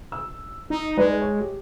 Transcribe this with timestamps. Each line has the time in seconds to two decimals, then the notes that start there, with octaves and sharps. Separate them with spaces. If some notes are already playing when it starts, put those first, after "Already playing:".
0.12 E6
0.70 D#4
0.97 G#3 D#4 B4 D5
1.21 C#5
1.40 G4